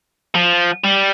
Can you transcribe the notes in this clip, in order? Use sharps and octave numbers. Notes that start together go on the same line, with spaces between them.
F3
G3